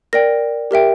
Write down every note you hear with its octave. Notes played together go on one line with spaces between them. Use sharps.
A#4 D5 G5 A#6
G4 A#4 E5 G5